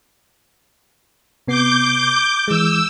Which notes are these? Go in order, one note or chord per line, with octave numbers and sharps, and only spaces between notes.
C3 B3 D6 G6 C7
E3 G#3 E6